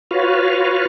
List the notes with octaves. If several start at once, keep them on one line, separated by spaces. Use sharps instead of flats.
F4 F#4 B4 C#5 F5